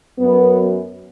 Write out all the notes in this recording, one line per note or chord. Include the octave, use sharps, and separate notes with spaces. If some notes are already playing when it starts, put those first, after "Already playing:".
F#2 F#3 B3